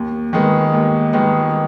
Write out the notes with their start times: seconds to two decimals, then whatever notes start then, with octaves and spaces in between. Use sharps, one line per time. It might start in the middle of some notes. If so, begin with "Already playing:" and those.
Already playing: D#2
0.33 D#3 G#3 B3
0.74 D#2
1.13 D#3 G#3 B3